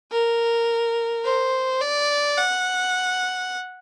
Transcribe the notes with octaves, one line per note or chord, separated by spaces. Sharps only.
A#4
C5
D5
F#5